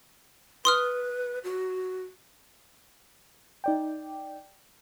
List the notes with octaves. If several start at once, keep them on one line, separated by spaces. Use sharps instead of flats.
B4 C6 D#6 F6
F#4
D#4 D5 G5